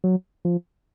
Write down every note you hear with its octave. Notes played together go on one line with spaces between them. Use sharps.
F#3
F3